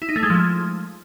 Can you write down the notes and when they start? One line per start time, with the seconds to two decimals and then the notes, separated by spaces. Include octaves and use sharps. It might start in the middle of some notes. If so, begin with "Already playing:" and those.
0.02 E4
0.09 D#4
0.16 A3
0.23 G#3
0.30 F3